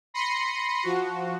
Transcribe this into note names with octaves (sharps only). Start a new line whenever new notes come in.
B5 C6 A#6 C7 C#7 D#7
F3 F#4